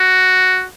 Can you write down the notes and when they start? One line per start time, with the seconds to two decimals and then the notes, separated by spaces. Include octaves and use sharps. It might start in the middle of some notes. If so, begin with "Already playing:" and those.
Already playing: F#4